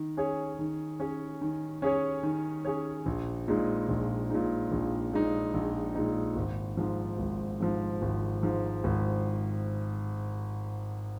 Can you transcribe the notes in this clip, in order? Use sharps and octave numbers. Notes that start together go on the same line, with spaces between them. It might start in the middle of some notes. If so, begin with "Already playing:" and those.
Already playing: D#3
C#4 G#4 C#5
D#3
C#4 G#4 C#5
D#3
C#4 G#4 C#5
D#3
C#4 G#4 C#5
A#1
A#2 G#3 D#4
A#1
A#2 G#3 D#4
A#1
A#2 G#3 D#4
A#1
A#2 G#3 D#4
G#1
G#2 F3
G#1
G#2 F3
G#1
G#2 F3
G#1